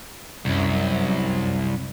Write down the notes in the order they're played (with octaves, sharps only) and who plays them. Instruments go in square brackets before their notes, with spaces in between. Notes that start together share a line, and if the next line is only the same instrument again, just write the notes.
[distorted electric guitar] C2 [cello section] F#2